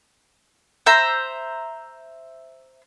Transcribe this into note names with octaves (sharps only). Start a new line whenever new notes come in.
C5 E5 A#5